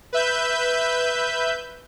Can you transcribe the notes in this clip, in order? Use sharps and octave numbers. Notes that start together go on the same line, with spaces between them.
B4 E5 G6